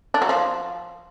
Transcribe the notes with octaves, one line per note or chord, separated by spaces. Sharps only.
D4
F#3
F3